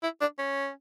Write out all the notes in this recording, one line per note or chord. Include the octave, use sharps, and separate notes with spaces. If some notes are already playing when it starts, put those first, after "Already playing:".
E4
D4
C#4